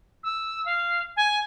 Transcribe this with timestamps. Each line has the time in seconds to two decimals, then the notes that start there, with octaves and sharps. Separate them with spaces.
0.23 E6
0.66 F5
1.17 G#5